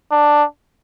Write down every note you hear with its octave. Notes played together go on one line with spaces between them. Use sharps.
D4